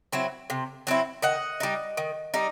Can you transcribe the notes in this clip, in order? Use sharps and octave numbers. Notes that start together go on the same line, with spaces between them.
F#3 C4 E4
C3
F#3 C4 E4
D#3 D#5 F#5
G3 D#4
D#3
G3 D#4